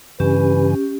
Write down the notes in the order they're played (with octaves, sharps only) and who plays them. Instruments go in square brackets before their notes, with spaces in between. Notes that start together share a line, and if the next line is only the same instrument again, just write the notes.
[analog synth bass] G2 [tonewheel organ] C#3 E3 G#5 [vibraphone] C#4 G4 [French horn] B4